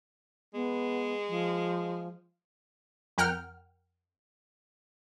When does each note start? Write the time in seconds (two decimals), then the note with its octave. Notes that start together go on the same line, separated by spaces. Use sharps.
0.54 G#3 B3
1.29 F3
3.18 F2 A#4 F#5 G5 F6